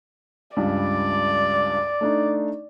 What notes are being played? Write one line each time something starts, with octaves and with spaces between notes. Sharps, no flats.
C#2 G2 G3 D5
A3 D4 D#4